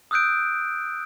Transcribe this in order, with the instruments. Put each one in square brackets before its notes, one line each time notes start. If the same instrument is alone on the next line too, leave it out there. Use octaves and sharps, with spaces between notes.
[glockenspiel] D#6 E6 F#6 G6 D7